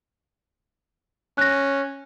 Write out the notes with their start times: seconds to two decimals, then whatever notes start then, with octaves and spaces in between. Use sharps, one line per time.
1.38 C#4 F#6 A#6